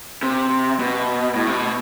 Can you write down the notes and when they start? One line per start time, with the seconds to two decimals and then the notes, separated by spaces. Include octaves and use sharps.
0.23 C3
0.80 B2
1.35 A2
1.47 C3
1.53 B2